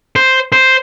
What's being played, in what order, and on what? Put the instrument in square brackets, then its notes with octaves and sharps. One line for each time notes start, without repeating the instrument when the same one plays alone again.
[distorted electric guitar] C5
C5